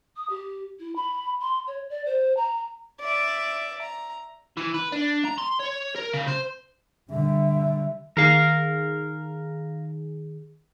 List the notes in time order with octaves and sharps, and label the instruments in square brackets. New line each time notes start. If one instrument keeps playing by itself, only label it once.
[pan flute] D#6
G4
E4
B5
C6
C#5
D5
C5
A#5
[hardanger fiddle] D5 E5
A#5
[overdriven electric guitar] E3
B4
D4
A#5
C6
C#5
A#4
C#3
C5
[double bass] D3 G3 [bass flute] E5
[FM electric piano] D#3 G#4 [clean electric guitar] A#4 F5